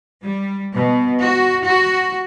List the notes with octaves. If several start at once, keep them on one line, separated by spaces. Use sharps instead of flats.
G3
B2
F#4
F#4